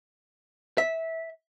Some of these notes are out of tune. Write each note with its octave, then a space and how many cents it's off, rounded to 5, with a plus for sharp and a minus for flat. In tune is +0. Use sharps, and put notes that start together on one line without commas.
E5 -15